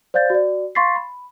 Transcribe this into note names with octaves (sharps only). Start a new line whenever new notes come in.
C5 D5 F5 G6 A6
F#4 D5
F5 C6 C#6 A6 B6 C7
B5